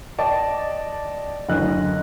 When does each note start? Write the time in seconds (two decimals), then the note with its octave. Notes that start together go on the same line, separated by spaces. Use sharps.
0.19 D5 D#5 G5 A5
1.49 F#1 D2 D#5 F#6